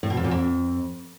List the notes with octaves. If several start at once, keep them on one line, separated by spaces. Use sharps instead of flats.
A2
B2
F2
A#2
F2